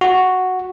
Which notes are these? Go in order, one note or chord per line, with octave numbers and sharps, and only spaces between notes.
F#4